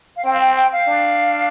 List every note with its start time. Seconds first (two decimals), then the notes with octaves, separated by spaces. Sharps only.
0.16 F5
0.24 C4 G5
0.33 F5
0.40 G5
0.55 G5
0.72 F5
0.88 D4